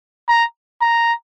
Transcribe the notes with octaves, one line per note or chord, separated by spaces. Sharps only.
A#5
A#5